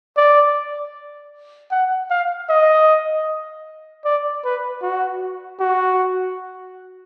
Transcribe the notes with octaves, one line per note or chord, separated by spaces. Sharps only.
D5
F#5
F5
D#5
D5
B4
F#4
F#4